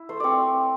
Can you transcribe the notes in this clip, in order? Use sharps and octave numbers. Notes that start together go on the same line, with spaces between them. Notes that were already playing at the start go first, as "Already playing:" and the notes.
Already playing: E4
A3 C5
C4 C#5 D5